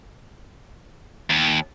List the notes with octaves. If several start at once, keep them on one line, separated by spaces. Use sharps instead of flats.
D#2